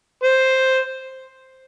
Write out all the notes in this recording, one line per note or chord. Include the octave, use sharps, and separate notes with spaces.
C5